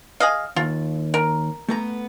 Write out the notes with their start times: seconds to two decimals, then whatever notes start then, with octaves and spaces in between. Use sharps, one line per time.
0.20 G#4 D#5 F5
0.56 D#2 F4
1.14 A#4
1.68 A3 B3 A#5